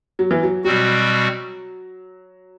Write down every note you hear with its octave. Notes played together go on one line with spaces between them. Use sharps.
F#3
E3
F#3
B2 F#3 G3 C4 F#4